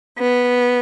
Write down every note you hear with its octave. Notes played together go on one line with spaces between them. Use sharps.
B3